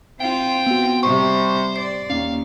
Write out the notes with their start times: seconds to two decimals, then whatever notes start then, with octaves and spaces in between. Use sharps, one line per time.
0.20 C4 F4 G5
0.66 B3 F#4
1.03 C3 G3 C5 C#6
1.76 D5 C7
2.10 D#2 C#4 F5